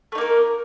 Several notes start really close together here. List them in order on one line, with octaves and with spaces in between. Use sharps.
A3 D#4 A#3 A#4